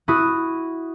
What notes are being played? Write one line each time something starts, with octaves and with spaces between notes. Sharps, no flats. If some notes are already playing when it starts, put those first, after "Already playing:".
E4 F#4 D#6